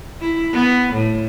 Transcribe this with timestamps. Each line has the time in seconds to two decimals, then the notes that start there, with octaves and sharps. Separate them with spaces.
0.21 E4
0.53 B3
0.94 A2